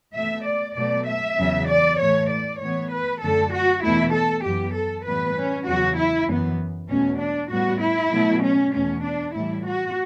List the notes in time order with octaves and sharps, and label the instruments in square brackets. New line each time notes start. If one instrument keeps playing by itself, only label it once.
[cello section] B2 A3 E5
D5
B2 F#3 A3 D5
E5
E2 C#3 F#3
D5
A2 E3 A3 C#5
D5
A2 E3 B3 C#5
B4
F#2 D3 A3 A4
F#4
E2 B2 A3 E4
A4
F#2 E3 B3 G4
A4
A2 E3 G3 B3 B4
C#4
E2 C#3 F#3 F#4
E4
F#2 E3 B3
E2 B2 F#3 A3 C#4
D4
A2 G3 B3 F#4
E4
B2 F#3 A3
C#4
E2 B2 A3 C#4
D4
A2 E3 G3 E4
F#4